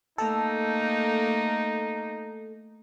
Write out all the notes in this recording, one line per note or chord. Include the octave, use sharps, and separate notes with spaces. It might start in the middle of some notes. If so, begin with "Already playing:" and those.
A3 A#3 D#4 A4